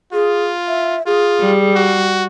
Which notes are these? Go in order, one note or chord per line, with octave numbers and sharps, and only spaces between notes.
F4 G#4
E5
F4 G#4
G3
F#4